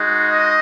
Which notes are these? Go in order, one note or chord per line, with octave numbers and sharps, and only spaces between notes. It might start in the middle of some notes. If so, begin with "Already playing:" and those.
Already playing: G#3 D#4 F#4
D#5